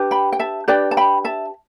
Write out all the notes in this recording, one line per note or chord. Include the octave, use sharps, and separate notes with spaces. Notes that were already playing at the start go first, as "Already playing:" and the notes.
Already playing: D4 G4 B4
G5 B5
G5
E5 A5
D4 G4 B4 D5 G5
A5
G5 B5
E5 A5